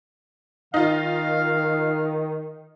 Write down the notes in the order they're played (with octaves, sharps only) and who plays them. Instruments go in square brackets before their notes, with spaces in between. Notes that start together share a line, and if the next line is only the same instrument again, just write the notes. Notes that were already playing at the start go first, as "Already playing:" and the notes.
[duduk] D#3 [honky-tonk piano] D#4 F4 [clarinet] F5